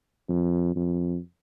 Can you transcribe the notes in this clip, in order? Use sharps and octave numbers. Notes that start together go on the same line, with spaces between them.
F2
F2